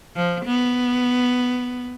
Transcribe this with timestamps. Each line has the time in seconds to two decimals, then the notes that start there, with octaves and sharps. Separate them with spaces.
0.16 F3
0.46 B3